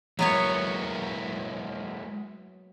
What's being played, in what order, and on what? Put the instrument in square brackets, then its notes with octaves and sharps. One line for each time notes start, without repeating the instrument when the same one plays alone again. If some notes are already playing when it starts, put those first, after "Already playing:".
[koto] F#3 B3 C#5 [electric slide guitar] G#3 A#3 E4